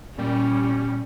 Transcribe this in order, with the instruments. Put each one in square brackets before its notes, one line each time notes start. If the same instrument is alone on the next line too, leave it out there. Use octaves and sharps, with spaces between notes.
[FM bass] A#2 [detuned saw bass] G3 [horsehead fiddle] C#4